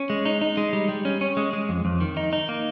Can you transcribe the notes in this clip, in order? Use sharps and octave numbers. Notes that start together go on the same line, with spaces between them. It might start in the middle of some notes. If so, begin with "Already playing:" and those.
Already playing: C#4
G#3
D#4
D#4
G#3
G3
G3
C#4
C#4
G#3
G#3
F2
F2
D#3
D#4
D#4
A#3